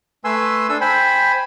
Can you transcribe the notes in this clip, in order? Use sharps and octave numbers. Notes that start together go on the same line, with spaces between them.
A3 B4 G#5 C6 E6
D4 A4 E6
C5 G5 G#5 B5